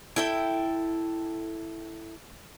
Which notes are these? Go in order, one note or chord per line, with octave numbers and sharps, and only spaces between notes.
E4 A4 G5